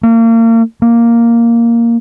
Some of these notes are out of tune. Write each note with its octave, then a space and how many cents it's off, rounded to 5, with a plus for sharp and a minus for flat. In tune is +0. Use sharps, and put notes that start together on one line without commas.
A#3 -35
A#3 +0